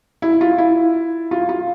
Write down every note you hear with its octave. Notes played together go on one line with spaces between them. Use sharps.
E4
F4
E4
F4
F4